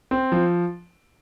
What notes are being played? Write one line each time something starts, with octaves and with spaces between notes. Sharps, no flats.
C4
F3